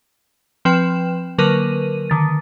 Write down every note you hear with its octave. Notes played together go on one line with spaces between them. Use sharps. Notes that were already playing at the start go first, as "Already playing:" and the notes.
F3 C4 B4 G5 E7
D3 F#3 A#3 A#4 B4 D#7
D3 D#3 A6